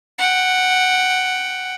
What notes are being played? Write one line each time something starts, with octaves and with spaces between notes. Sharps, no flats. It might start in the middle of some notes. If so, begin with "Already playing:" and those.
F#5 G5